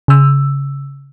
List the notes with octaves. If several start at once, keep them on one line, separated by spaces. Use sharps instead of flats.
C#3 E6